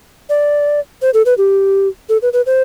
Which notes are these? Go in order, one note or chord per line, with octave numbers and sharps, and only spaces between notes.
D5
C5
A4
B4
G4
A4
B4
B4
C5